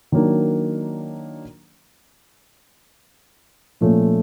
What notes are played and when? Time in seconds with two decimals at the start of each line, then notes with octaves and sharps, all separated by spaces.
0.12 D#3 F#3 A#3 D4
3.81 A#2 F3 A3 C#4